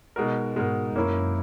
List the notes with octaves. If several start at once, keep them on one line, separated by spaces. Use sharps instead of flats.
B2 G#3 D#4 F#4 A#4
G#2 B2 G#3 D#4 F#4 A#4
F#2 A#3 C#4 E4 A#4